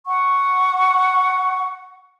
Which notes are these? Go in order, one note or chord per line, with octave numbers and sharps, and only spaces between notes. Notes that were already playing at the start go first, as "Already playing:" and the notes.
F#5 C#6